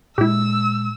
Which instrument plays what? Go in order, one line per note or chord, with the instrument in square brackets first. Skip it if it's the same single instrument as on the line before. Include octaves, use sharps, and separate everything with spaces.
[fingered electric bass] A#2 G#3 [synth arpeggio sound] E4 G4 [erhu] E6